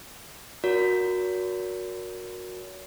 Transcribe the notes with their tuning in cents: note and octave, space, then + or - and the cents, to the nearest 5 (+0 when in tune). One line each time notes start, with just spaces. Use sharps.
F#4 -15 A#4 +0 C#5 +40